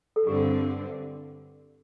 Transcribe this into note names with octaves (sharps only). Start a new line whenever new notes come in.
A4
G2 D3 C4 G4